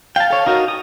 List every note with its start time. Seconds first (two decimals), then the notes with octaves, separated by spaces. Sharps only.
0.16 F5 G5 A5
0.30 A4 C#5
0.46 D#4 F#4 A#4
0.68 D#6